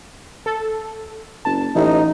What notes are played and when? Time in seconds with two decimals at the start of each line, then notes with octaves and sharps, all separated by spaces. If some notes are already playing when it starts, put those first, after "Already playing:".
0.46 A4
1.45 F#1 A5
1.75 A1 E3 D#4